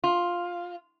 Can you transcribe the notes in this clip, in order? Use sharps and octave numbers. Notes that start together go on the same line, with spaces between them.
F4